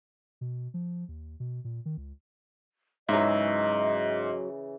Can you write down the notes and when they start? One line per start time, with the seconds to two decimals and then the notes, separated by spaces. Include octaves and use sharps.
0.41 B2
0.74 F3
1.08 D#2
1.40 B2
1.64 A#2
1.85 D#3
1.97 C#2
3.09 G#2 C#3 E3 F#3 D#5 E5